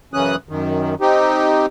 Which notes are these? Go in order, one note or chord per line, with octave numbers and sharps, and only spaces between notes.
F#2 C#3 E3 C#4 D#6 F#6
F#2 D#3
C4 D#4 G4